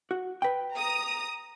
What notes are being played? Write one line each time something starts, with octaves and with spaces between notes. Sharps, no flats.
F#4
B4 G5
A#5 D#6